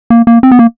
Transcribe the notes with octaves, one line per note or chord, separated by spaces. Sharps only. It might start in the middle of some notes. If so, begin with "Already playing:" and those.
A#3
A#3
C4
B3
A#3